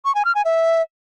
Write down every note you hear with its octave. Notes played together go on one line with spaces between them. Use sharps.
C#6
G#5
F6
G#5
E5